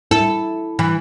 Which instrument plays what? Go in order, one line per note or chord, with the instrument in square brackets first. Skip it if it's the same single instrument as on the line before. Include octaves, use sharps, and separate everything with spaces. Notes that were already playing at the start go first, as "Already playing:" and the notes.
[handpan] E4 [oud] A4
[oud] E3